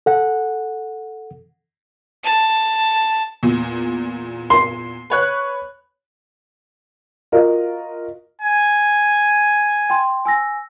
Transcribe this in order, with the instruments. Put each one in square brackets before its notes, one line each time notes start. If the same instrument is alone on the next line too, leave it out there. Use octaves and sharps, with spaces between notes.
[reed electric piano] A4 F#5
[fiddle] A5
[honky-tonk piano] E2 A#2
[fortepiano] C6
[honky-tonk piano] B4 C#5 F#6
[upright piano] F4 F#4 A#4 D#5
[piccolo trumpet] G#5
[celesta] G5 C6
G#5 E6 A#6